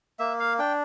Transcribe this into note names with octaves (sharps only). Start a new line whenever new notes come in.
A#3 E5
F5
D4 G5